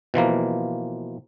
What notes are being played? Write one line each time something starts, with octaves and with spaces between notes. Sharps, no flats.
B2 E3 F3 A#3